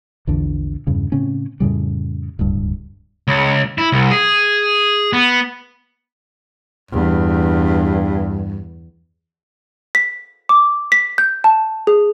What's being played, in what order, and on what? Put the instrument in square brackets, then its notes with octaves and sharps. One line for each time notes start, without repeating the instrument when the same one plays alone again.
[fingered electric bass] A#1 E2 D3
E2 G2 C#3
A2 C#3 C4 C#4
F2 A2 C#3 G3
D1 C#2 G2
[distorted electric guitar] C#2
E4
C2
G#4
B3
[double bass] E2 [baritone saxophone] G2
[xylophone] B6
D6
B6
G6
A5
G#4